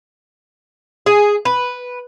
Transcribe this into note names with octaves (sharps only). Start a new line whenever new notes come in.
G#4
B4